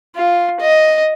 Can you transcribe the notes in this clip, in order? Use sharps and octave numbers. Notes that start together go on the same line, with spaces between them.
F4
D#5